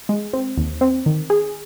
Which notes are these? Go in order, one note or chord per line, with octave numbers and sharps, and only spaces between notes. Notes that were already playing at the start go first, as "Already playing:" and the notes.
G#3
C4
D#2
C4
D#3
G#4